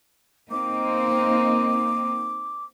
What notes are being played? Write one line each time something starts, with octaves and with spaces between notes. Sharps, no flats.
A#3 C4 D#4 D6